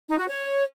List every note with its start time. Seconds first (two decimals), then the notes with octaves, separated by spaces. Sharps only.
0.09 D#4
0.18 F#4
0.27 C#5